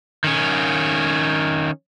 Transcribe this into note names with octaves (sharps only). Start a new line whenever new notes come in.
D#3 C#4